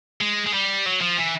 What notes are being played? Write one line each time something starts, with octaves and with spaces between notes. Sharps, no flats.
G#3
G#3
G3
F#3
F3
E3